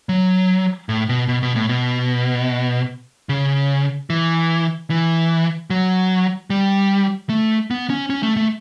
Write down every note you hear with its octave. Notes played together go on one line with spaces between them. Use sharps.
F#3
A2
B2
B2
B2
A2
B2
C#3
E3
E3
F#3
G3
A3
B3
C#4
C#4
A3
A3